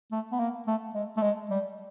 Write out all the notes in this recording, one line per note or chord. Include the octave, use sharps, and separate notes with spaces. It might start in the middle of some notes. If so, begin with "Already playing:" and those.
A3
B3
A#3
A3
G#3
A3
G#3
G3